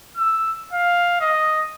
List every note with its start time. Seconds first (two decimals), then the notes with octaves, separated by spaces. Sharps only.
0.17 E6
0.73 F5
1.21 D#5